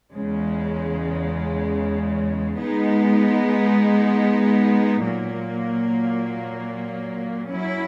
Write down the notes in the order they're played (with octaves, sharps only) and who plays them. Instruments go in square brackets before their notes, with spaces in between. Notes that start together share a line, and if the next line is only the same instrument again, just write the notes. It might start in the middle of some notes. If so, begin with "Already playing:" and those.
[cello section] E2 C#3 G#3
G#3 B3 D#4
A#2 F#3 A#3
F#3 C#4 E4